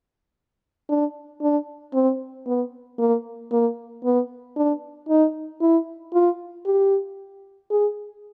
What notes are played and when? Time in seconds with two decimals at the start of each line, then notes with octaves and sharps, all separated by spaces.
0.89 D4
1.42 D4
1.94 C4
2.47 B3
2.99 A#3
3.52 A#3
4.04 B3
4.57 D4
5.09 D#4
5.61 E4
6.13 F4
6.66 G4
7.71 G#4